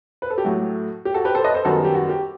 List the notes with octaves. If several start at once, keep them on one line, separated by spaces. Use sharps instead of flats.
B4
A4
G4
A2 F#3 A3 F#4
G4
F#4 A4
G4 B4
A4 C5
B4 D#5
A4 C5
F#2 D#3 G3 B3 F#4 A4
G4
F#4
G4